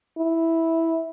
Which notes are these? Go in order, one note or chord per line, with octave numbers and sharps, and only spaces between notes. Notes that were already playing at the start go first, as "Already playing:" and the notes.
E4